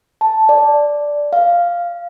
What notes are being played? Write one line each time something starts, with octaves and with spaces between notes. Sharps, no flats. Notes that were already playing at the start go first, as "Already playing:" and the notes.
A5
D5
F5